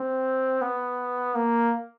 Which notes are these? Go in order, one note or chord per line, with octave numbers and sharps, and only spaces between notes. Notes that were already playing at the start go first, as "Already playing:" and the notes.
Already playing: C4
B3
A#3